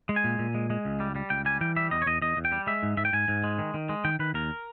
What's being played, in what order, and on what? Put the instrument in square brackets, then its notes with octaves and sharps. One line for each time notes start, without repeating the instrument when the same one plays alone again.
[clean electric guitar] G#3
G#5
A#2
A#2
G#3
G#3
C#2
G3
G3
C#2 G5
G3 G#5
E3 G5
G3 E5
E2 D#5
C#5
E2 D#5
E2 D#5
E2
G5
G3
G#3 E5
G#2
G#2 E5
G5
G#2 G#5
G#2
G#3
D#3
D#3
G#3
D#3 G5
D#3 B4
D#2 A#4